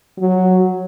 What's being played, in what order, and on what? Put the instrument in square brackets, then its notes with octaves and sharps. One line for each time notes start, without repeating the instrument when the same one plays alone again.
[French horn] F#3